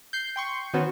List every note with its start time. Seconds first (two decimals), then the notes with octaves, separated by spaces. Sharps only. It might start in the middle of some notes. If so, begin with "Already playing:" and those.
0.13 G6 C7
0.36 G5 C6 C#6
0.74 D#3 B3 C#4 F#4 B4 C5